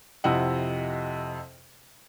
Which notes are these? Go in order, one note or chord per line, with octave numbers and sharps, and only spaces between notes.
F2 C3 E4 D#5 F#5